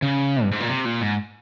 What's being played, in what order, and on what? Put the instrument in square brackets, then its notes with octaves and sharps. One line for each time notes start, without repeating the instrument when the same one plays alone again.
[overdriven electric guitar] C#3
G2
G#2
A#2
C3
A#2
G#2